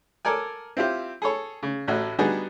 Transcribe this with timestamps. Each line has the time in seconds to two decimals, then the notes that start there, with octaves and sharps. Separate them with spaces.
0.25 A4 A#4 D5 G#5
0.77 C4 E4 F4 G4
1.22 G#4 A4 C#5
1.63 C#3
1.87 A1 A2 F#4
2.18 G3 B3 D4 D#4 F#4 G#4